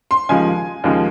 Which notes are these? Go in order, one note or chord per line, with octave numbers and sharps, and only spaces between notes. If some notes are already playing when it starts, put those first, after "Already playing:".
C6
D#2 C#3 F3 G#3 G#5
D#2 C#3 F3 G#3